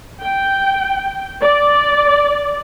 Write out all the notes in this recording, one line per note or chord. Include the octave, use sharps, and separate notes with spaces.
G5
D5